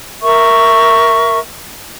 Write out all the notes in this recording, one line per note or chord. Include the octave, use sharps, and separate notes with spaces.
A#4 E5 C#6